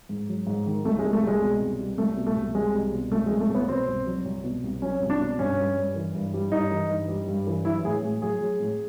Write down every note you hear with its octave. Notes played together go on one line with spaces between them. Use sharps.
G#2
F#3
G#2
D#3
C2 A3
G#3
G3
A3
C2 G#3
B2
C2
G3
C2 A3
B2
A3
C2
G3 G#3
C2
B2
C2 A3
G#3
F#3
A3
C2
B3
B2 C4
C2
F#3
C2
B2
C2
F#3 C#4
C2
D4
B2
G2 C#4
G3
G2
E3
G2
G3
G2 D#4
E3
G2
G3
G2
E3
F#3 E4
A2 G#4
A2
F#3 G#4
F#3
A2